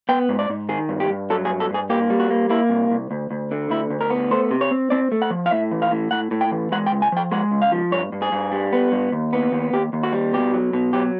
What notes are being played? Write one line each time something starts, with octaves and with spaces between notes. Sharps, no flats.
B3 G5
G#2
D5
G#2
D#3 G#4
G2
G4
G2
F#3 A4
G#4
G2
A4
G2 G#4
A#3 G4
G3
F#4
A#3
A#3 E4
C2
C2
D2
D2
D3
D2 E4
D2
A#4
B3
A3 C5
C3
C#5
C4
C4 D5
A3
F#5
F3
F5
A2 E5
E3
F5
A2
A2 F#5
A2
G5
E3
G#3 F#5
G5
C#2
G#5
F3 G5
G#3 F#5
C#2
F5
F3
G2 C#5
G2
G#4
G2
G3
B3
G2
D#2
B3
D#2
D#2 G4
D#2
F#4
G3
B2 G4
F#3
B2
F#3 G4